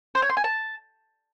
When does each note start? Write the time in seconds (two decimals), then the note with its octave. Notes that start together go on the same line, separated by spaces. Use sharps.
0.15 C5
0.22 C#5
0.30 C6
0.37 G#5
0.44 A5